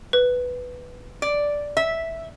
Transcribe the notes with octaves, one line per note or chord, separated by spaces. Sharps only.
B4
D5
E5